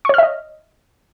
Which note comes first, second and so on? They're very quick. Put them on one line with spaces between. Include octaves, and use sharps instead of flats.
C#6 C#5 F6 E5 D#5